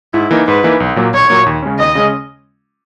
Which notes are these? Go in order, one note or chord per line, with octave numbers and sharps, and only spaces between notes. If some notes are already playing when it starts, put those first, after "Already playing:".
G#2 E4
E3 A#3 D#4
G#2 B4
E3 A#3 D#4
B1
A#2 F#3 A#3
B1 C#5
A#2 F#3 A#3
D#2
C#3 G#3 C#4
D#2 D#5
C#3 G#3 C#4